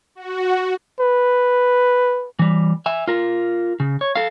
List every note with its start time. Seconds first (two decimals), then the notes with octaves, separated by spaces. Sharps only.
0.15 F#4
1.00 B4
2.39 E3 G3
2.86 E5 G#5
3.08 F4 A#4
3.80 C#3
4.01 C#5
4.15 A4 F5